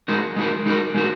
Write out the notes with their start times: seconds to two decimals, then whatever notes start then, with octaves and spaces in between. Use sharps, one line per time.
0.08 G#3 D#4 F#4 A#4
0.36 G#3 D#4 F#4 A#4
0.66 G#3 D#4 F#4 A#4
0.94 G#3 D#4 F#4 A#4